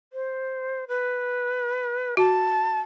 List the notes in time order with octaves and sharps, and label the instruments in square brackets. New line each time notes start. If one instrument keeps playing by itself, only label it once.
[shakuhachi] C5
B4
[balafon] F#4 [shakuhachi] A5